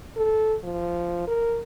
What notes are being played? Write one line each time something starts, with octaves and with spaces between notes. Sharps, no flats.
A4
F3
A#4